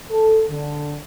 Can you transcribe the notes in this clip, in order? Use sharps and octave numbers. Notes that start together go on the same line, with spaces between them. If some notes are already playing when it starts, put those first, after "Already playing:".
A4
D3